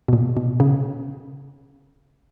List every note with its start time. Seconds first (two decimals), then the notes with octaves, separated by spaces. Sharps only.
0.08 B2
0.13 A#2
0.37 B2
0.60 C#3